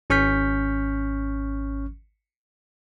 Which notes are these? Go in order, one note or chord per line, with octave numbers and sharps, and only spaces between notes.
G#1 C#4 C#6 F6 G6 B6